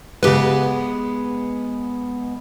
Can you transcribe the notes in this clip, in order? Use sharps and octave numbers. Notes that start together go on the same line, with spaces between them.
C#3 G#3 B3 G4 B4